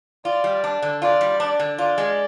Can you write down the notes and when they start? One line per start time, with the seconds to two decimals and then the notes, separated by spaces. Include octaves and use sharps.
0.25 F4 D5
0.44 G3
0.64 D4
0.82 D3
1.02 F4 D5
1.21 G3
1.40 D4
1.60 D3
1.78 F4 D5
1.98 G#3